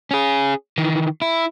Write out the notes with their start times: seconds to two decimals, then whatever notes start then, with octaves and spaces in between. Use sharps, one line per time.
0.11 C#4 G#4
0.78 D#3 E3
1.22 E4